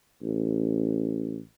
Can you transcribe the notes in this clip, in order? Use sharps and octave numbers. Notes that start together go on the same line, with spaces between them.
A1